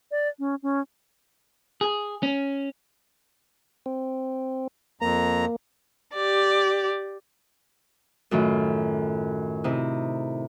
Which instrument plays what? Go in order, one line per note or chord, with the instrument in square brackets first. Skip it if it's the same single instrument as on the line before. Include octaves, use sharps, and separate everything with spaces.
[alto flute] D5
C#4
C#4
[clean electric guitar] G#4
C#4
[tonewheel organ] C4
[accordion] F2 A#5 [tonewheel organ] A#3
[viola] G4 D5
[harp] F#2 A2 D#3 F4
C3 D#4 E4